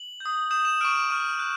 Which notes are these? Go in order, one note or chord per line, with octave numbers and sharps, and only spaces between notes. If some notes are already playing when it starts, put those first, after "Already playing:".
Already playing: F#7
G6
D#6
D#6 G6 E7
E7
C#6 F6 D7
C#6 F6 D#7
F#6